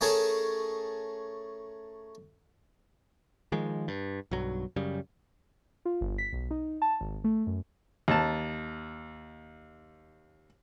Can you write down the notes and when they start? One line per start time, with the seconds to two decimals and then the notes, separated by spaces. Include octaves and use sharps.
0.01 A3 C#4 G#4 A#4 G#5 A5
3.52 D#3 F3 G#3
3.88 G2
4.31 B1 G2 F#3
4.76 F#2 C#3 G3
5.85 F4
6.01 G1
6.18 B6
6.33 B1
6.51 D#4
6.82 A5
7.01 G#1
7.24 A3
7.47 F#2
8.08 D#2 A5